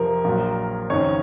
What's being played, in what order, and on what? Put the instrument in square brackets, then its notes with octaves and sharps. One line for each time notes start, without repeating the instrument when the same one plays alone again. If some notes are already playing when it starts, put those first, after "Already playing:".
Already playing: [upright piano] F2 C3 F3 A#4
A#1 A#2 F#3
F#1 F2 D#3 C#5